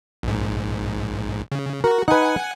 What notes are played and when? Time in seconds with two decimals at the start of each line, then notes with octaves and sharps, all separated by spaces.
0.23 A#1 G#2
1.52 C#3
1.84 F#4 A#4
2.08 D#4 B4 F#5 G#5